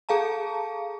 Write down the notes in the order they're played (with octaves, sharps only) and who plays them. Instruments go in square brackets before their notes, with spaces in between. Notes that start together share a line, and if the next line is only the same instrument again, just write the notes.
[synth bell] G#4 A4 F5 A5 A#5